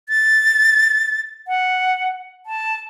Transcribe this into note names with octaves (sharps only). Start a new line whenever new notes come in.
A6
F#5
A5